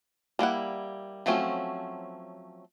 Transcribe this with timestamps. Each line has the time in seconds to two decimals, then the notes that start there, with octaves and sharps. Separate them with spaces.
0.39 G3 A#3 E4 F#5
1.26 F3 F#3 A3 C4 C#4